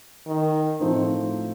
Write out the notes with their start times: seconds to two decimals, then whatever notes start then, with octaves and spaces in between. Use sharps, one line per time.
0.27 D#3
0.80 A2 F3 A3 C4 D#4